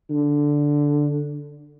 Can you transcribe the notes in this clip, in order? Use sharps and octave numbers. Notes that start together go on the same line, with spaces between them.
D3